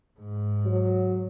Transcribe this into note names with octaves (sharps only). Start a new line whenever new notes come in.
G#2
F#3